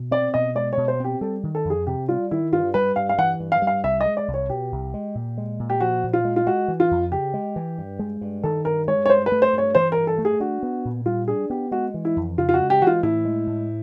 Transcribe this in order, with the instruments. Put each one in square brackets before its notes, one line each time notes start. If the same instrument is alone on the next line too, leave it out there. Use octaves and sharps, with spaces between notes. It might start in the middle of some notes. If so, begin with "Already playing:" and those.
Already playing: [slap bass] B2
[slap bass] C4 [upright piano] D5
[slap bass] B2 [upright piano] D#5
[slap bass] G#3 [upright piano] D5
[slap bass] B2 [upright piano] C#5
[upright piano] C5
[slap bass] C4 [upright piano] G4
[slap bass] G3 [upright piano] A4
[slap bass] D#3
[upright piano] A4
[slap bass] F2
[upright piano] G#4
[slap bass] C3 [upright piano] G4
[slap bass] G3 [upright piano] F4
[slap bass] D#3 [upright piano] E4
[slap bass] G2 [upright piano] F4
[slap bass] G3 [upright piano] B4
[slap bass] G2 [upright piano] F5
[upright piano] F5
[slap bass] E3 [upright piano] F#5
[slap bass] G2
[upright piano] F5
[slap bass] G3
[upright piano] F5
[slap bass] C2 [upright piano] E5
[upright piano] D#5
[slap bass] G#3
[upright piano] D5
[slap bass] C2
[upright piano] C#5
[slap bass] B2 [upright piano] G4
[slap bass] C2
G#3
A#2
G#3
A#2
[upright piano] G4
[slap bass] F3 [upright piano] F#4
[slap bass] A#2
[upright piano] F4
[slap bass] G#3
[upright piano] F4
[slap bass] G#3 [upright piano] F#4
[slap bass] E3
[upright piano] F4
[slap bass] F2
[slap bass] C#3 [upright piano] G4
[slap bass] G#3
E3
G2
G#3
G2
[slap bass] D#3 [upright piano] A4
[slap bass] G2 [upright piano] A#4
[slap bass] G#3 [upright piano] C#5
[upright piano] C#5
[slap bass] G2 [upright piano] C5
[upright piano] B4
[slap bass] A3
[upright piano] C5
[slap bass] G2 [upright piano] C#5
[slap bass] E3 [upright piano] C5
[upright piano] A#4
[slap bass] G2
[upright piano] A4
[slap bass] A3
[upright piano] G#4
[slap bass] D4 [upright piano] F#4
[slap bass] B3
A#2
[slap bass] G3 [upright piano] F4
[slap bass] D4 [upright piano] G#4
[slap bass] B3 [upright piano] G4
[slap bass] G#3 [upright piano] F#4
[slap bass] E3
[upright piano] E4
[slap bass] F2
[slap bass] C#3 [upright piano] F4
[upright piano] F4
F#4
[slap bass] G#3
[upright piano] G4
[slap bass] E3 [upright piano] F#4
[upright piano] F4
[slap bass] A2 [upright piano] E4
[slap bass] G#3
A2